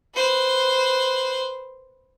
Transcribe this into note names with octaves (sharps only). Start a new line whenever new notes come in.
B4 C5